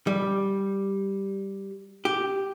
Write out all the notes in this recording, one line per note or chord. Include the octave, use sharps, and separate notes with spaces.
G3
G4